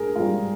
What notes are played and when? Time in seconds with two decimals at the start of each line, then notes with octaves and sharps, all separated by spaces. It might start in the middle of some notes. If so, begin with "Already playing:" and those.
Already playing: G#2 G#4 A#4
0.15 G#2 G3 F4